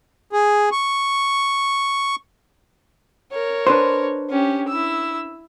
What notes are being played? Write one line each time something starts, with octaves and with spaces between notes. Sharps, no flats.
G#4
C#6
A#4 C#5
D4 B4 C5
C#4 G4
E4 E6